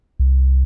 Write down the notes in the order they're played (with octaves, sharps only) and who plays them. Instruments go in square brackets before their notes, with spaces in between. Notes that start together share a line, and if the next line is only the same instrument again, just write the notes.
[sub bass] C2